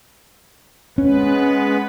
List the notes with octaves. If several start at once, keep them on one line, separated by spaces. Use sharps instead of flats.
G#3 B3 C#4 B4